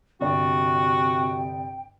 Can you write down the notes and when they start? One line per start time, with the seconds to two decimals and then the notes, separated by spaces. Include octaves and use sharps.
0.21 G1 C3 D4 F#4 G5